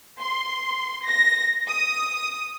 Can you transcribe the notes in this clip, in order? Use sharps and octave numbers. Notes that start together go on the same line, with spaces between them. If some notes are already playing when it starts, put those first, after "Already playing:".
C6
A#6
D#6